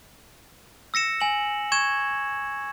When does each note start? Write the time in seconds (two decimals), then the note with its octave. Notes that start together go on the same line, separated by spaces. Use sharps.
0.94 E6 A#6 C#7 E7
1.21 G#5 F#7
1.72 C#6 G#6 E7